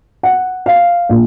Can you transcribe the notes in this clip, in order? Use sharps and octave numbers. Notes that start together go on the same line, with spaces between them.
F#5
F5
A#1